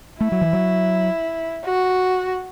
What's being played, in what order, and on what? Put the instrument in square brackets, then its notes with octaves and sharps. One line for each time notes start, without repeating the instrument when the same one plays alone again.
[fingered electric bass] A3 [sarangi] E4
[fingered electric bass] F#3
E3
F#3
[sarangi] F#4